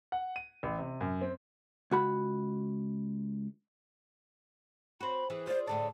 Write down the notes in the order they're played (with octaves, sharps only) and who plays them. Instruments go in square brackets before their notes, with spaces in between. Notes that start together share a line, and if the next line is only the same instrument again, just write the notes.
[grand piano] F#5
D#7
A1
C3
F#2
C4
[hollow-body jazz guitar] C#2 F#4 B5
[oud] C4 F#4 [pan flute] B5
[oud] E3 [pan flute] G#4
[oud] F4 D5 [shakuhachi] C5
[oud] A2 D3 D5 [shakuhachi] A5